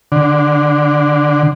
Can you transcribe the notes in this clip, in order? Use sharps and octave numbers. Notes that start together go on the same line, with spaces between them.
D3